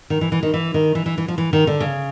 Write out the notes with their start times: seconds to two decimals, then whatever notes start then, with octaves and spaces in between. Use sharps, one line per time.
0.10 D#3
0.21 E3
0.32 E3
0.43 D#3
0.54 E3
0.74 D#3
0.95 E3
1.06 E3
1.18 E3
1.28 F3
1.38 E3
1.53 D#3
1.67 D3
1.80 C#3